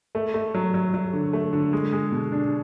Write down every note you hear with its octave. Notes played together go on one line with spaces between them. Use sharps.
A3
A3
F#3
F#3
F#3
D3
A3
D3
G#3
G#3
B2
D4